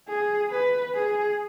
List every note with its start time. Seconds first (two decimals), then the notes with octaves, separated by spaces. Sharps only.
0.09 G#4
0.51 B4
0.95 G#4